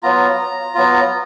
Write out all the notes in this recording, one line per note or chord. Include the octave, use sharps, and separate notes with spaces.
F#3 B3 F4 A#5
F#3 B3 F4